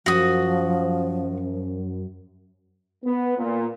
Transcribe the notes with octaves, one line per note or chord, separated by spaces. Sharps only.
F#2 F3 F#4 D#6
B3
A#2